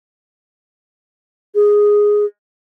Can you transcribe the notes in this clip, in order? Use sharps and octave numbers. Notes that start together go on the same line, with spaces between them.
G#4